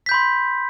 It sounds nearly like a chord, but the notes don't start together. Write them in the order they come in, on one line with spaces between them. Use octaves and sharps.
B6 G6 B5 C6